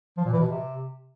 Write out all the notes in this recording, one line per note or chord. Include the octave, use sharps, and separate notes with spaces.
F3
A#2
E3
B2
C3